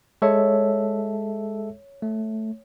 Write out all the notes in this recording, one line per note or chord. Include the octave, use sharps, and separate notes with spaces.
G#3 A4 C#5 E5
A3